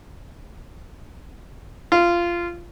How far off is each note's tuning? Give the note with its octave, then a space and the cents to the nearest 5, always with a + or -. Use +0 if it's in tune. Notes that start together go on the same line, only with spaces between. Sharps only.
F4 -15